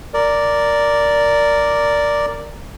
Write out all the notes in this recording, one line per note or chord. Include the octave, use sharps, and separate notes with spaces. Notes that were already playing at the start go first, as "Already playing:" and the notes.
A#4 D5